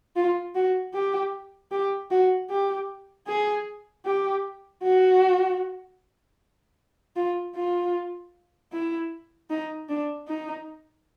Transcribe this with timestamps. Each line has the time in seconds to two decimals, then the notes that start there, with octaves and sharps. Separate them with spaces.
0.16 F4
0.55 F#4
0.93 G4
1.71 G4
2.11 F#4
2.50 G4
3.27 G#4
4.05 G4
4.83 F#4
7.16 F4
7.55 F4
8.72 E4
9.50 D#4
9.89 D4
10.28 D#4